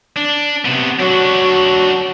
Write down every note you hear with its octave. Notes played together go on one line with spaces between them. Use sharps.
D4
C3 B3
F#3 D4 F#4